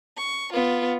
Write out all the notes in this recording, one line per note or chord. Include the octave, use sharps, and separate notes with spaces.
C#6
B3 F4